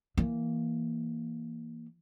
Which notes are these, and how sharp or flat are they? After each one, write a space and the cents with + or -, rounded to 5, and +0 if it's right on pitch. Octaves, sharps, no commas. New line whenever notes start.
E3 +0 A#3 +0